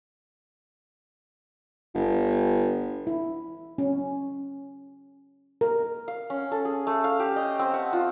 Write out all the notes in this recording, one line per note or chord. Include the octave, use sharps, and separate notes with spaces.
G1
E4
C#4
A#4
F5
C#4
A4
G#4
A3
F5
G4
D#5
C4
F#5
F4